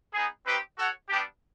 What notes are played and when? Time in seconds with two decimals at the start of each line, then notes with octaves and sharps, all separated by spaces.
0.14 B3 D#4 G#4
0.46 C4 D#4 G4 B4
0.78 F#4 A4 C#5 F#5
1.09 G3 B3 D4 G4